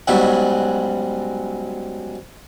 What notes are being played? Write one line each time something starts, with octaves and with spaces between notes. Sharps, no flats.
G#2 B2 F#3 G3 C#4 E5